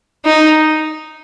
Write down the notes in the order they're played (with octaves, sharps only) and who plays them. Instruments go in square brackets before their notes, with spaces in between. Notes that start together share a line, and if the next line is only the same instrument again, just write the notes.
[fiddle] D#4